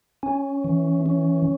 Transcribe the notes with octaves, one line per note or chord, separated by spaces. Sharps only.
C#4
E3
C#4